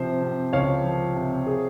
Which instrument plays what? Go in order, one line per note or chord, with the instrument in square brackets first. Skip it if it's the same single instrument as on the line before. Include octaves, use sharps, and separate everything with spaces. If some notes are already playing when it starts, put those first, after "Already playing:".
Already playing: [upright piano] C3 F3 [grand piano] C5
[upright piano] C3
[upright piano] C#2 [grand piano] C#5 F5
[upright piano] F3
C3
G#4